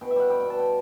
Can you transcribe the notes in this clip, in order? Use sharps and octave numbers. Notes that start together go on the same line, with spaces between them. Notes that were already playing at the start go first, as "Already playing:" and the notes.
B2 G5
E5
G3 F#5
G3 G5
G5
B2 A5
G5